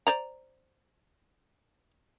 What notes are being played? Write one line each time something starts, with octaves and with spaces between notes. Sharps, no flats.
C5 D5 A#5